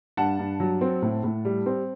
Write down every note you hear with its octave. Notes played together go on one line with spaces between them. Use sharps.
G2 F#5 A5
G2
F#3
C4
A2
A2
G3
C4